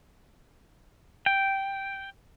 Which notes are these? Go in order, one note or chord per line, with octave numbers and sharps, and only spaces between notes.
G5